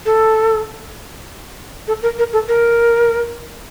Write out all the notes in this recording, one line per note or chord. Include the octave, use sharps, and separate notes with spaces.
A4
A4
A#4
A#4
A4
A#4